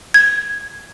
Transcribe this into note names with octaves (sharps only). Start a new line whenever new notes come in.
G#6